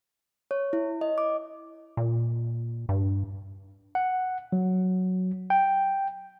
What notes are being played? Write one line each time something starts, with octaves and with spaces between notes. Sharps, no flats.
C#5
E4
D#5
D6
A#2
G2
F#5
F#3
G5